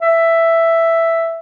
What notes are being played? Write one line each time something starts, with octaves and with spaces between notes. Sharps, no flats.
E5